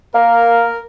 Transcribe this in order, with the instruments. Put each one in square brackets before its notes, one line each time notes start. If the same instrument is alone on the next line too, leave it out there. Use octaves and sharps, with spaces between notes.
[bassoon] A#3 [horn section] A#4